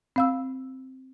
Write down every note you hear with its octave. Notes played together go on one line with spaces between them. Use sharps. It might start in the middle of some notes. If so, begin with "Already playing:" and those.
C4 F5 E6